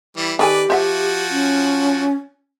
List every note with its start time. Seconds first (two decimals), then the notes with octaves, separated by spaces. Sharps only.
0.17 E3 G3
0.39 D#3 G4 A4 B4 D5 G#5
0.70 F3 F#4 C5 E5 F#5
1.31 C#4